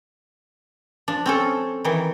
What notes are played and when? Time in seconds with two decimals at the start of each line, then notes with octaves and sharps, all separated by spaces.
1.08 F3 D4
1.26 C4 C#4 A4
1.84 D#3 E3